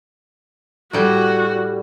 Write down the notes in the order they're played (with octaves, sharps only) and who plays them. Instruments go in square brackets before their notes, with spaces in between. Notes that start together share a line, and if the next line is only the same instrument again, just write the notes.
[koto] A2 G3 [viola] F#4